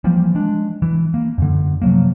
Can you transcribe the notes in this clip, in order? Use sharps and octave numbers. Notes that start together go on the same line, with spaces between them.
E3 F3 G3 A#3
G#3 D4
E3
A#3
F#2 D3
C3 F3 F#3 A#3